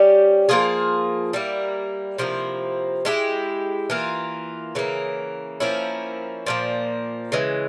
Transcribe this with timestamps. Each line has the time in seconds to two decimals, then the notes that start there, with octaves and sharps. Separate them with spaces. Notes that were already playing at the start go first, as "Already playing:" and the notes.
Already playing: G3 C#4 G4
0.49 F3 A#3 F4 G#4
1.33 G3 A#3 E4
2.18 C3 F3 A#3 E4
3.05 G#3 E4 G4
3.90 E3 A#3 F4
4.75 C#3 E3 A#3
5.60 F3 A#3 C#4 E4
6.46 A#2 F3 A#3
7.32 C#3 E3 G#3